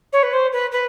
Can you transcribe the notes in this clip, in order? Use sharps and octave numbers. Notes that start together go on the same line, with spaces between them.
C#5
B4
C5
B4
B4